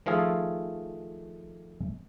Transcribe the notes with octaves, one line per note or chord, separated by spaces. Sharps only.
D#3 F3 A3 F4 G#4 A4